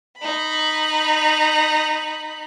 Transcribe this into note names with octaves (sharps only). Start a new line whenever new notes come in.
D#4 B5